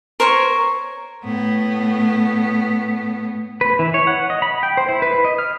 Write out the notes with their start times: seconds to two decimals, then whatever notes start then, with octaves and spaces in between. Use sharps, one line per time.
0.20 A#4 C5 C#5 C#6
1.24 A2 B3
3.61 B4
3.79 E3
3.94 C#5
4.07 F#5
4.30 D#5
4.42 B5
4.63 G5
4.77 C5
4.89 E4
5.02 B4
5.25 D#5
5.39 F6